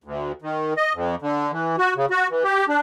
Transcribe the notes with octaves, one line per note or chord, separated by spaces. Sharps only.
D2
D#3
D#5
F2
D3
E3
F#4
C#3
F#4
E3
G4
D4